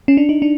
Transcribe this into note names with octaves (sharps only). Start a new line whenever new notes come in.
C#4
D4
D#4
D4